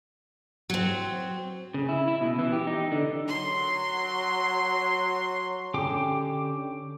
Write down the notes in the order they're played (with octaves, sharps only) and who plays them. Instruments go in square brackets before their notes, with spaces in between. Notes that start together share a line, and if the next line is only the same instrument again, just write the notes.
[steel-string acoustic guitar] F#3 C4
[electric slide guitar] C#3
E4
E4
B2
E3
G4
D#4
D3
[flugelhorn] F#3 [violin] C6
[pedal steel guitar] D3 C#4 G4 G5 D6